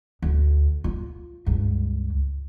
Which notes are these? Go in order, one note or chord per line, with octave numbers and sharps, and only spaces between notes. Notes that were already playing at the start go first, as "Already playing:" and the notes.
D2
F4
C#2 G2